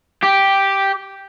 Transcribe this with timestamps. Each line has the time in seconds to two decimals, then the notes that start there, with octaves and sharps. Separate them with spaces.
0.23 G4